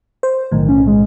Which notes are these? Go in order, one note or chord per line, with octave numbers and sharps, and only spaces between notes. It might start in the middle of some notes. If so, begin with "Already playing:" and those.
C5
B1 A2 D#3
C#4
G#3